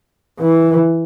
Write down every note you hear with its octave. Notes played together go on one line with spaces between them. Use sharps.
E3